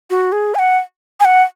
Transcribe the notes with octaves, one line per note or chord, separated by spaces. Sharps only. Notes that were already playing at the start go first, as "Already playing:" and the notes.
F#4
G#4
G#5
F#5
G#5
F#5